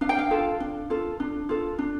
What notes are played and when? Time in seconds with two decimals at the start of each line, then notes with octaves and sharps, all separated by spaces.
0.01 D4 F5
0.09 G5
0.19 F5
0.31 F4 A4
0.60 D4
0.90 F4 A4
1.20 D4
1.49 F4 A4
1.79 D4